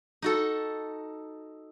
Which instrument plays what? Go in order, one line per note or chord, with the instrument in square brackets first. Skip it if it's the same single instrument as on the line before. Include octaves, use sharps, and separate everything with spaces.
[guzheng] D#4 F#4 A4